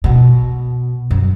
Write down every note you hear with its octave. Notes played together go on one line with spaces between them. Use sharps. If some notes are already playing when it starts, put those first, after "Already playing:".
B2
F#2